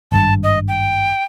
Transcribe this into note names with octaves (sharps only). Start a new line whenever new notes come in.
G#1 G2 A5
D#5
G5